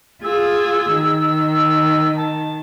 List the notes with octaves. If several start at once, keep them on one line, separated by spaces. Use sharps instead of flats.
F4 G#4 E6
D#3
A5